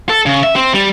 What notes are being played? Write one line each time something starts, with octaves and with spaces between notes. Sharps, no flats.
A4
C#3
E5
C4
G3